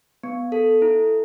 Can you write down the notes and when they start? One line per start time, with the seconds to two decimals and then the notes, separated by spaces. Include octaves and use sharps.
0.23 B3
0.52 A4
0.82 E4